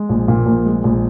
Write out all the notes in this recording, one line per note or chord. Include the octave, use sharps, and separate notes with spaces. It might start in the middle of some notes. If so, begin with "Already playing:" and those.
Already playing: G#3
A#1
A#2
A#1
G#3
A#1